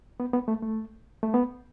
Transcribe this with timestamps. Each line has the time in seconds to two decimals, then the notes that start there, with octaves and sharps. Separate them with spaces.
0.20 B3
0.33 B3
0.48 A3
0.62 A3
1.23 A3
1.34 B3